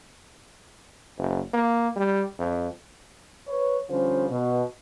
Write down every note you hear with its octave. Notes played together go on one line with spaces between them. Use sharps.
F#1
A#3
G3
F2
B4 C#5
D3 F3 G3 C#4 F4 C5
B2